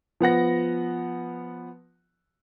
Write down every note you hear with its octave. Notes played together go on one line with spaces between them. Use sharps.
F3 B3 F#5 A#6